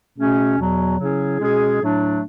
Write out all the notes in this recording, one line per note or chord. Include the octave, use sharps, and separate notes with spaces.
B2 A3 C#4 G#4
E2 B2 F#3
C#3 F#3 C#4 E4 G#4
B2 G#3 C#4 G#4
A2 F#3 A3 D4